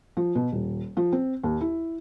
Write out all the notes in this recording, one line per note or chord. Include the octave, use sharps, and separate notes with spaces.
F3
B2
D#1
F3
C4
D#2
E4